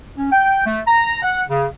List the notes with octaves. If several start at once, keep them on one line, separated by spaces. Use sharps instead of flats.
C#4
G5
A3
A#5
F#5
C#3